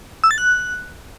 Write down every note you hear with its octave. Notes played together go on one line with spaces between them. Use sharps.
E6
A6
F#6